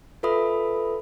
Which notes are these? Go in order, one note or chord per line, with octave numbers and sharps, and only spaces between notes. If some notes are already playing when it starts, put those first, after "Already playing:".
F4 A4 B4 E5 B5 D#6